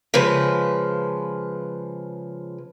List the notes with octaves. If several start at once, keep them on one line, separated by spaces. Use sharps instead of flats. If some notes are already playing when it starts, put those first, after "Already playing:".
C#3 F3 G#3 B4